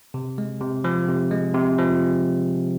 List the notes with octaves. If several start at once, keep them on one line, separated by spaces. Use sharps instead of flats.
C3
G#3
C3
F3
C3
G#3
C3
F3